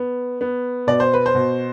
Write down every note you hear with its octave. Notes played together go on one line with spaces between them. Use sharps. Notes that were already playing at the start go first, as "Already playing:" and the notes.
Already playing: B3
B3
B2 D5
C5
B4
C5
B2